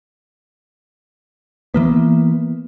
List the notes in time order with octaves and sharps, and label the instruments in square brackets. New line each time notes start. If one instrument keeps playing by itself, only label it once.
[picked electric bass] E3 A#3 B3